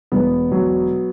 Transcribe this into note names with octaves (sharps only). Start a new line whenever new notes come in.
E1 B3
F#3